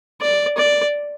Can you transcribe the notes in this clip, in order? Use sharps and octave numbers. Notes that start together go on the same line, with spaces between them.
D5
D5